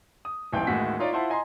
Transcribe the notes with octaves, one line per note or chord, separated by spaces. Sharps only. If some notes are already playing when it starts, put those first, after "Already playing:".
D#6
D#1 B1 E3 G5 G6
A1 D#2 A2 G#3 F#4 B6
D#4 F4 C#5 D5
E4 F4 C5 F#5 A5 C6
D#5 G#5 A#5 C6